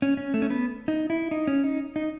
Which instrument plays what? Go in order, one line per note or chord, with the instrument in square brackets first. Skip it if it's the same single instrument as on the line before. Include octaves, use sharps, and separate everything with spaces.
[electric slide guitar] C#4
C#4
A3
C#4
B3
D#4
E4
D#4
C#4
D#4
D#4